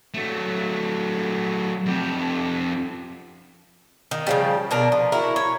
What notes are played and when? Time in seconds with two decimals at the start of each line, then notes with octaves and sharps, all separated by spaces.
0.14 F#3 A3
1.86 F2 G4
4.11 D#3
4.27 C#3 F3 G3
4.71 B2 D4 A#4
4.92 F3
5.12 E4 F#4 A#4
5.36 C#5